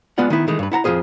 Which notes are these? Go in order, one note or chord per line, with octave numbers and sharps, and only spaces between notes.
G#3 B3 F4 D5 F#5
D#3 B3 E4
D#3 E3 G#3 A3
G2 B4
E4 F#5 A5 A#5
F2 D#3 F4 G#4 C5